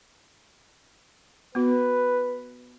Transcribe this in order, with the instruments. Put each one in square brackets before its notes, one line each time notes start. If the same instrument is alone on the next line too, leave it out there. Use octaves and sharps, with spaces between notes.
[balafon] B3 F#4 [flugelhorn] B4